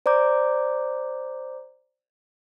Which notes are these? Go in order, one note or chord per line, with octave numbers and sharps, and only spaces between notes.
C5 D5 A#5 D6 G6